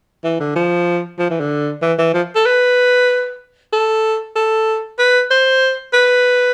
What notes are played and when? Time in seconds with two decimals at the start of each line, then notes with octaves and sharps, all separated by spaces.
0.24 E3
0.40 D3
0.56 F3
1.19 F3
1.30 E3
1.40 D3
1.82 E3
1.99 E3
2.14 F3
2.35 A4
2.46 B4
3.73 A4
4.36 A4
4.99 B4
5.31 C5
5.94 B4